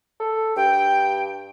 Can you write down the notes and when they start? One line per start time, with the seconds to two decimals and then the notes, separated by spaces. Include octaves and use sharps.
0.20 A4
0.56 G2 G5